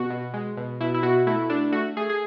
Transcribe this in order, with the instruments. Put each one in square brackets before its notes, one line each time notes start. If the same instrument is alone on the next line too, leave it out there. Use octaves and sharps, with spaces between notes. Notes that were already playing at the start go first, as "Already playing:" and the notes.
Already playing: [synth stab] B2 F#4
B2
G#3
B2
B2 E4
E4
B2 F#4
A3 E4
A3 D4
A3 F#4
A3 G#4
G#4